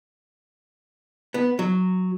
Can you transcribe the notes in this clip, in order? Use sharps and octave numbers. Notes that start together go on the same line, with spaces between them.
B3
F#3